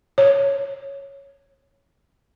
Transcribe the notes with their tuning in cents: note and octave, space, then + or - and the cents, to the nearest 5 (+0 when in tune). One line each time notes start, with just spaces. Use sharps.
C#5 +0